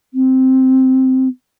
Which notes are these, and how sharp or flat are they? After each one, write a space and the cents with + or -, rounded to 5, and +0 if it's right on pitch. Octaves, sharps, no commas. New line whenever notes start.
C4 -5